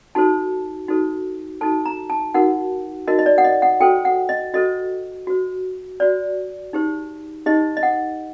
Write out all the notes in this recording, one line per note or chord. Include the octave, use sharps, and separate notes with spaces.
D#4 F#4 A4 C5 A5
D#4 F#4 A4 C5
D#4 F#4 A4 C5 A5
A#5
A5
D#4 F#4 A#4 F#5
D#4 F#4 A#4 D#5
D#5
D5
F#5
D#5
F#5
F#4 A4 C5 G5
F#5
D#5
F#4 A4 C5 D#5
F#4 C5
F#4 C5 D5
D#4 G4 C5
D#4 G4 C5 D#5
D#5
F#5